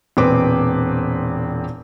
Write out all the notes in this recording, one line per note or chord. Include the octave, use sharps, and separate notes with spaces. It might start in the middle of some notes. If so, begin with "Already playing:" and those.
E1 A#2 C4 B4 C5 D6